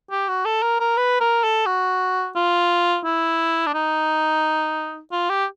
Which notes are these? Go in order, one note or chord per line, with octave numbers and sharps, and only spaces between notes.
G4
F#4
A4
A#4
A#4
B4
A#4
A4
F#4
F4
E4
D4
D#4
F4
G4